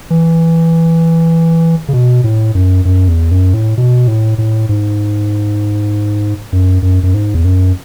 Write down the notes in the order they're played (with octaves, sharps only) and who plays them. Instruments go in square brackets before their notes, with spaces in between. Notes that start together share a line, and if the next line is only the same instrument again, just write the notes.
[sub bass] E3
C#3
B2
A2
F#2
F#2
E2
F#2
A2
B2
A2
A2
G#2
F#2
F#2
F#2
G#2
E2
F#2